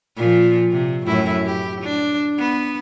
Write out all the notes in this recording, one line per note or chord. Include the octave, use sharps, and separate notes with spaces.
A#2 F3
C3
F#2 A2 E4
G4
D4
B3